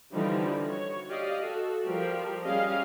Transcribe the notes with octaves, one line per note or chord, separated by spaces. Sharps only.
D3 E3 F3 G3 D#4
F#4 C#5
G4 D5 D#5 F5
F#4 A4
F3 G3 G4 A#4
G3 C#4 G#4 D#5 F5